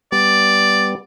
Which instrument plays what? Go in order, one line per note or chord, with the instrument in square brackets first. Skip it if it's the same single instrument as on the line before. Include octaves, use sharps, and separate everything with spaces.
[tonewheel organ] G3 B3 [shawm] D5